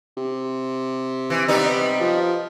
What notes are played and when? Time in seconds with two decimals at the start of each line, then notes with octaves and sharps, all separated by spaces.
0.17 C3
1.30 E3
1.48 G3 B3 D#4
2.01 F3